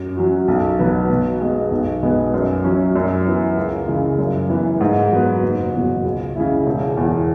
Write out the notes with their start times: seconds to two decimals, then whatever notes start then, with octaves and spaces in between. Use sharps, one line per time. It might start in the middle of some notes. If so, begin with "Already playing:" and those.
Already playing: F#2
0.17 F#3 C#4 F#4
0.48 B1
0.79 B2 F#3 B3
1.09 B2
1.41 G#3 B3
1.71 B1
2.03 B2 G#3 B3 G#4
2.34 F#2
2.64 F#3 C#4
2.95 F#2
3.26 E3 B3
3.57 C#2
3.87 C#3 E3 G#3
4.19 F#2
4.49 E3 B3
4.80 G#2
5.12 F#3 B3
5.42 F#1
5.73 E2 B2 F#3
6.04 C#2
6.36 C#3 G#3 E4
6.66 E1
6.97 E2 E3